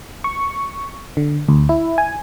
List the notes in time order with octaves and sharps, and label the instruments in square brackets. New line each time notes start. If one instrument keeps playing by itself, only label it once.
[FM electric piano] C#6
D3
D2
E4
G#5